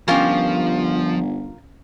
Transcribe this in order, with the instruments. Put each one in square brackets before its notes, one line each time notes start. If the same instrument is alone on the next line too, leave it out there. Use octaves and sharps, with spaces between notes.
[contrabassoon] G1 [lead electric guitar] F3 [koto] C#4 G4 [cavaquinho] F4 A#4